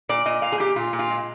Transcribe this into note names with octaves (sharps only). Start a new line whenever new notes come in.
A#2 D5
A#2 D#5
A#2 F5
G#4
A#2 G4
A#2 F4
A#2
F4
G#3